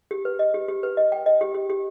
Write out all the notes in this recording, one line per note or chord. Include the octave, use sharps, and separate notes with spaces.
G4
B4
D#5
G4
G4
B4
D#5
G5
D#5
G4
G4
G4